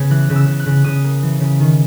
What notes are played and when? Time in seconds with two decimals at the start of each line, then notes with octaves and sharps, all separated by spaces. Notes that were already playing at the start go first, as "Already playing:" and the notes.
Already playing: C#3 B3 G#6
0.10 E3 F#6
0.30 C#3
0.36 E6
0.48 C#3
0.60 F#6
0.66 C#3
0.84 C#3 D#6
1.04 A#3
1.23 E3
1.40 C#3
1.60 D#3